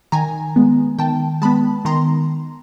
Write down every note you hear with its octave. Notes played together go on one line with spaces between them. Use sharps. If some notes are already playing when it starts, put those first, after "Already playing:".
D#3 G#5 A#5
G#3 B3
D#3 G5 A5
G#3 B3 A5 B5
D#3 A#5 C6